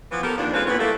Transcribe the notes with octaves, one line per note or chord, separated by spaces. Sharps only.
E3 F3 B3
B3 G4 A4 A#4
D#2 D#3 F3 D4
G#3 C4 C#4 F4 A4 B4
A#2 E3 B3 B4 C#5
G3 A3 A#3 E4 A4